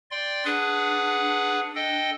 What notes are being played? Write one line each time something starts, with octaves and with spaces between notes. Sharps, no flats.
D5 G5 C6
D4 G#4 B4 F#5
A4 D#5 G5